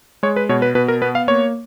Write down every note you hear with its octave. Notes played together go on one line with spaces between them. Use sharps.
G#3 C#5
B4
B2 C#5
B4
B2 B4
A#4
B3 B4
F5
A#3 C#5